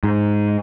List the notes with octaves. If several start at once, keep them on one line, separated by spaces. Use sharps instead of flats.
G#2